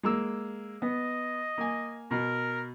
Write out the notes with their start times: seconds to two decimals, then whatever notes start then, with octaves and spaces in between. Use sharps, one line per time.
0.03 G#3 A#3 E6
0.82 B3 D#5
1.58 A#3 G#5
2.11 B2 A#4